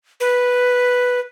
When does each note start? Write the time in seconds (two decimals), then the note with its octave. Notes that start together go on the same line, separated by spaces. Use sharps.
0.20 B4